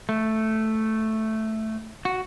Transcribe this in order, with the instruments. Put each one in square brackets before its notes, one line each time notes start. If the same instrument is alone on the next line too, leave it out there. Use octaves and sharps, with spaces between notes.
[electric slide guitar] A3
F#4